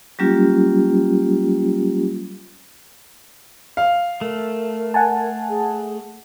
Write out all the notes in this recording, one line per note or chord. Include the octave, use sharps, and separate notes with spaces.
F#3 G3 A#3 C#4 F4 G4
F5
A3 A#4
F#5 G#5 A5
G#4